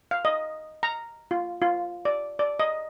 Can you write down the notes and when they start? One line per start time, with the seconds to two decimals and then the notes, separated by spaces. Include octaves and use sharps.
0.11 F5
0.25 D#5
0.83 A#5
1.31 F4
1.62 F4
2.05 D5
2.39 D5
2.60 D#5